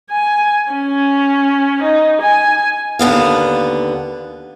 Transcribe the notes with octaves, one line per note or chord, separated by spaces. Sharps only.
G#5
C#4
D#4
G#5
D#2 D3 B3 F5